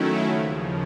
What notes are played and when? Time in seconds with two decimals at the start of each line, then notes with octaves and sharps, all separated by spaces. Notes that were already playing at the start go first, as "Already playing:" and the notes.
Already playing: D#3 F#3 A3 C#4 E4
0.25 D#2 C#3 F3